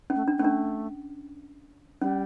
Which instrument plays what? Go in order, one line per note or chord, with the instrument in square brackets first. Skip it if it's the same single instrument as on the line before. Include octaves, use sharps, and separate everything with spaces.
[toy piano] C#4
[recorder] A3
[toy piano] D4
[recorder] A3 [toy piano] C#4
[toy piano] D4
[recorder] G3 [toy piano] C#4